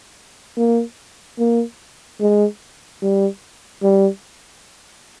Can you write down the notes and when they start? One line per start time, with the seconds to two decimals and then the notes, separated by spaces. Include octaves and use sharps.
0.57 A#3
1.38 A#3
2.21 G#3
3.02 G3
3.83 G3